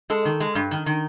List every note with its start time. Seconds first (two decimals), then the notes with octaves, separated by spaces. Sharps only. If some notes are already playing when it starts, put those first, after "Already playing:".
0.10 G#3 A4
0.25 D#3
0.40 G#3
0.55 G2
0.71 D#3
0.86 D#3